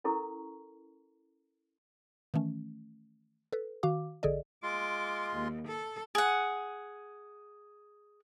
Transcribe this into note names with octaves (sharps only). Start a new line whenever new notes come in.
C#4 E4 A4 A#4 A#5 C#6
D#3 E3 A3 C#4
A4 B4
D#3 F#4 F5 D6
A#1 D3 G#4 A4 D5 D#5
G#3 F4 C6 D6
D#2
A4
G#4 F#5